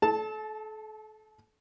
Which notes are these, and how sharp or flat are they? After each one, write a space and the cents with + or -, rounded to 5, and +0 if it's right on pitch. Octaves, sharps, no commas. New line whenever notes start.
A4 -35 A5 +0